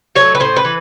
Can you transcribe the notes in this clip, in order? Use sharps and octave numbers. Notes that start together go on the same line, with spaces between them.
F#3 A3 C#5
B4
A2 C5
B4
E3